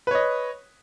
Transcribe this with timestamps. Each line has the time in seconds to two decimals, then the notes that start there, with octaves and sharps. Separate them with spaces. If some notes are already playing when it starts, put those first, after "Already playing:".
0.07 B4
0.11 C#5
0.15 D#5